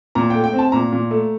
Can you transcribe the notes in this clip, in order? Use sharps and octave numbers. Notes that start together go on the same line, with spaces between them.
A#2 A#5
A3 G5
G5
C4
A5
A#2 A#5
A#2
A3